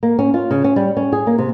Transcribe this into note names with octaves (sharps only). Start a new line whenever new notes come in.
A#3
C#4
F4
C#3
C#4
G3
C#4
G#4
A#3
C3